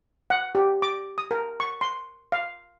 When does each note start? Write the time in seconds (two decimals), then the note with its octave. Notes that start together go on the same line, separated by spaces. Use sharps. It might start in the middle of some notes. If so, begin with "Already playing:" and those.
0.30 F#5
0.55 G4
0.82 D6
1.18 D#6
1.31 A#4
1.60 C#6
1.81 C6
2.32 F5